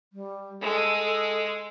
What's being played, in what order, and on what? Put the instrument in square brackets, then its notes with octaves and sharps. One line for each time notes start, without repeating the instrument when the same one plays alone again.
[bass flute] G3
[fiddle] G#3 [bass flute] A4
[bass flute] A4